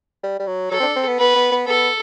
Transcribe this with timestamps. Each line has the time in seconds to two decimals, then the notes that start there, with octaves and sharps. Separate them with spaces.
0.23 G3
0.40 G3
0.47 F#3
0.71 F#3 A4
0.80 C4
0.83 D4
0.96 C4
1.07 B3
1.19 B3 B4
1.36 B3
1.52 B3
1.67 B3 A4